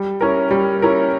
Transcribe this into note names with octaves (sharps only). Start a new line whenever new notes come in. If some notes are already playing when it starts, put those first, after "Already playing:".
Already playing: G3
C#4 E4 A#4
G3
C#4 E4 A#4